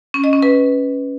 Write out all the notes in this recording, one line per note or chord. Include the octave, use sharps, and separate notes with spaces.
C#4
D#5
C#4
B4